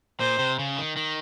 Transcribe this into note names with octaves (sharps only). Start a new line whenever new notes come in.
A#2 C5
C3
C#3
D#3
D#3